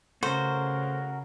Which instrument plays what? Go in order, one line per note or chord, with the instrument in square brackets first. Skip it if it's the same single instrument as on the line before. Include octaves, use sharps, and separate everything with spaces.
[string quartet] C#3 [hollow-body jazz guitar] A3 [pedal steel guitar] F#4 A#4 [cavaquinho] C5